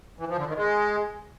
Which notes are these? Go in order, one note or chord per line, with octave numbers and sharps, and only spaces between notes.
E3
F3
D3
D#3
G#3